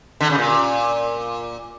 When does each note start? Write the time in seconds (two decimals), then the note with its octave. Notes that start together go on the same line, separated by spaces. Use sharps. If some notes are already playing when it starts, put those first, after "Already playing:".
0.20 D3
0.30 C#3
0.38 A#2